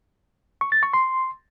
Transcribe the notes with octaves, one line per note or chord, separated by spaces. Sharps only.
C#6
A6
C#6
C6